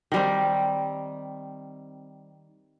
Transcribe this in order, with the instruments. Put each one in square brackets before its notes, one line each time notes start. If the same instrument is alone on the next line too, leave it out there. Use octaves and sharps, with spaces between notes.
[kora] D#3 G3 C4